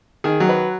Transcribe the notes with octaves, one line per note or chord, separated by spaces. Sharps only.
D#3 G#4
F#3
B4